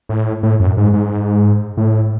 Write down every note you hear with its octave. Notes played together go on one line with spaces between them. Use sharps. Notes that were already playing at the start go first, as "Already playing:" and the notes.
A2
A2
F#2
G#2
G#2
A2